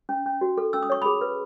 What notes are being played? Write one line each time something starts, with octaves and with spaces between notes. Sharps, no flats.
C#4
C#4
F#4
A4
C#4 E6
D#6
C#5 C#6
G#4 B5 D#6
B4